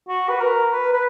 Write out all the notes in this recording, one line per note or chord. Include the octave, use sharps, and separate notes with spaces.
F#4
B4
A#4
B4
B4